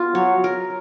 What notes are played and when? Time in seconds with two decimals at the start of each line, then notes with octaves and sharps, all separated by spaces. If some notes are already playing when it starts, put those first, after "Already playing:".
Already playing: B3 F4
0.15 F#3 C#5
0.44 A#4